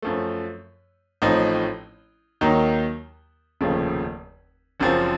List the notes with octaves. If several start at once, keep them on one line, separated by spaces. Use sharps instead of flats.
F#2 F3 A3
A1 A2 F3 C4 D#4
D#2 D#3 F#3 A#3 D#4
F1 D#2 C#3 F3 A3
F#1 F#2 F3 C4